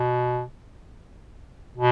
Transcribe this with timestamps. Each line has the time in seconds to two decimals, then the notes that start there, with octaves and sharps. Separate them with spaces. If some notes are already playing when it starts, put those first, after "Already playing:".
Already playing: B2
1.77 B2